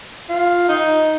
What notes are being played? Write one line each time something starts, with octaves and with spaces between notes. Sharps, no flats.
F4
D#4